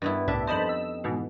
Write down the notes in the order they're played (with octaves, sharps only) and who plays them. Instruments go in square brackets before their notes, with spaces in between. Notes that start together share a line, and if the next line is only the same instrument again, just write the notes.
[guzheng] G2 B3 E4
[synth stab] C2 A2 E5 [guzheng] D4
[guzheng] F2 D#4 D#5 [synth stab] C5 A5 B5
[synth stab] E6
G#2 B2 E3